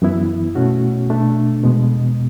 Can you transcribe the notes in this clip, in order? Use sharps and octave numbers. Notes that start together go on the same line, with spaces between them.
F#2 E3 B3 E4
B2 A3 C#4 F#4
B2 A3 D4
E2 B2 G#3 B3